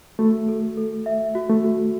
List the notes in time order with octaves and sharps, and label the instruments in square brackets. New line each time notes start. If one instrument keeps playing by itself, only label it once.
[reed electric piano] A3 [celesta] F#4
[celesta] A4
A4
E5
F#4
[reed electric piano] A3
[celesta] F#4